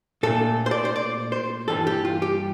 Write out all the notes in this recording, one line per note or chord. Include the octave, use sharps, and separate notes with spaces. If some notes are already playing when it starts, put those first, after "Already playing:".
A#2 A3 D4 A4
C5
D5
C5
D5
C5
G2 E3 G3 D4 A4
G4
F4
G4